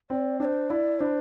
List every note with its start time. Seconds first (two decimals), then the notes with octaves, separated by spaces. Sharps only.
0.10 C4 D5
0.40 D4 C5 D5
0.70 E4 D5
1.00 D4 C5